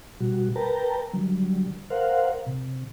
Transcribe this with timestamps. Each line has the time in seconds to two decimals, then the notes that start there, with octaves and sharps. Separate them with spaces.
0.20 B2 G3 F#4
0.56 A#4 B4 G5 A5 A#5
1.13 D3 F#3 G3
1.90 A#4 C5 F5 F#5
2.46 C3